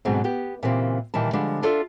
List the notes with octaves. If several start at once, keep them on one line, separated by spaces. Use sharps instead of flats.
G#2 B2 D3 F#3 G#3 C4
B3 G4
A#2 C#3 E3 C4 G4
A#2 D#3 E3 G3 A5
D3 F3 G3 G#3 D4
D4 F4 A4 D5 E5